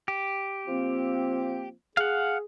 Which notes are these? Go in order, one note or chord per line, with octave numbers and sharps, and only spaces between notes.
G4
F3 A#3 C4
G#4 F5 F#5